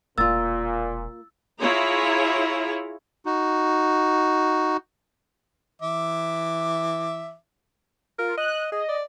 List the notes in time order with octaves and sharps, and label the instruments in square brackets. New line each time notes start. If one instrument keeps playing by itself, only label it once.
[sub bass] E1 [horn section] A#2 [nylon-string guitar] A#3 F4 [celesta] E6 A6
[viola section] E4 F4 G#4 C#5 A#5
[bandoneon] D#4 F#4
[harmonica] E3 E5 D6
[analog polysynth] F4 [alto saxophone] A#4
[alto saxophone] D#5 [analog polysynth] F#6
[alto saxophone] G#4 [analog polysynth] D#5
[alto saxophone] D5